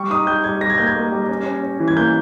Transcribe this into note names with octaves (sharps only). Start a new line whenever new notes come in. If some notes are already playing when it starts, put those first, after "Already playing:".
Already playing: G3 C#6
D#4 D#6
G3 G6
G3 G#6
G3 A#6
G#6
A#3 G6
G#6
A#3
G3
C#4
C#4
C#4
E3
G#6
A#3 G6